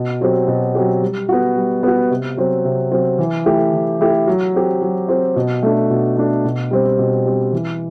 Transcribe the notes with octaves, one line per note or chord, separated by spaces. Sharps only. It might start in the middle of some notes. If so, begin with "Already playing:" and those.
Already playing: B2
F#3 C4 G4
B2
F#3 C4 G4
G3
B3 F#4
G3
B3 F#4
C3
F#3 C4
C3
F#3 C4
E3
A3 E4 G4
E3
A3 E4 G4
F#3
C4 G4
F#3
C4 G4
B2
A3 D4
B2
A3 D4
B2
G3 C4
B2
G3 C4
E3